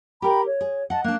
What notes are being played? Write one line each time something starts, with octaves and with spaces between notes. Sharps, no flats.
G4 A#4 G5 A#5 B5
C#5
G#4
D#5 F#5 A5
A#3 D4 F#6